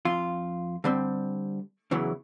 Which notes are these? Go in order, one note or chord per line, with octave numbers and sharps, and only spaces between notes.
F2 F4 C6
D3 G3 C4
E2 C#3 E3 F#3